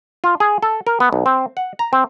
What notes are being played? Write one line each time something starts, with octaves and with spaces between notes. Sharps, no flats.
F4
G#4
A4
A#4
B3
B1
C4
F#5
A#5
C4